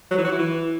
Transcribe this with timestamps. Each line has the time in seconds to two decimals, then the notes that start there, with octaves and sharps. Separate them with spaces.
0.11 F#3
0.18 E3
0.25 F#4
0.32 E4
0.39 E3